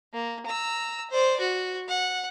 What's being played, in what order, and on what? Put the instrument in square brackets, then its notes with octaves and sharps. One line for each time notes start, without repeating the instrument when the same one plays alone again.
[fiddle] A#3
A#5 E6
C5 D5
F#4
F#5